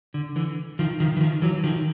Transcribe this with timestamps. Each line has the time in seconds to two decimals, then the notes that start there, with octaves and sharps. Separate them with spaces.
0.14 D3
0.36 D3 E3
0.79 D#3 F3
1.00 D#3 F3
1.17 E3
1.21 D#3 F3
1.42 E3 F#3
1.64 D#3 F3